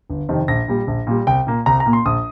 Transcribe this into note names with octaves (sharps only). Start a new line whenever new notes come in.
G1
F2 C3 D#3
A#1 A#6
A#2 G3
A#1
A#2 G3
C2 G5
A#2 A#3
C2 A#5
A#5
A#2 A#3
C6
A#1 D#6